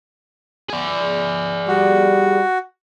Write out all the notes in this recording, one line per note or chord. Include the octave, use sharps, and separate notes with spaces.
G#4 D5
G3 F#4